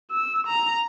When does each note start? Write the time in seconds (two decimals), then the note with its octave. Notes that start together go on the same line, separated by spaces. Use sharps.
0.11 E6
0.47 A#5